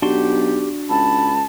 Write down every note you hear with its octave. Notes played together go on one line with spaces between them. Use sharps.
B1 D4 F#4 G4 C6
C#2 A5 B5